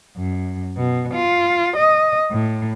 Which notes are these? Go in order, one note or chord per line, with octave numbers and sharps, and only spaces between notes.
F#2
B2
F4
D#5
A2